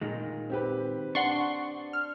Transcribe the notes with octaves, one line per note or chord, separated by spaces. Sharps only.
A#2 D#3 G#3
C4 G4 B4
D4 F#5 C6 C#6
F6